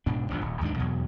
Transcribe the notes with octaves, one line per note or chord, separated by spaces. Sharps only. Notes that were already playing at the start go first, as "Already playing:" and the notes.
G#2 B2 D4
G#1 C#2 F3 D4
D#1
D#2 G#2 C#4 D4
E2 B2 F#3